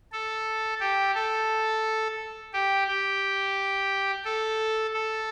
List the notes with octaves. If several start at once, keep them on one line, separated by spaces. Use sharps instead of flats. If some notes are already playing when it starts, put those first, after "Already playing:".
A4
G4
A4
G4
G4
A4
A4